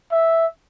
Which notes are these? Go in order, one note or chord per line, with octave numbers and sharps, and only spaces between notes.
E5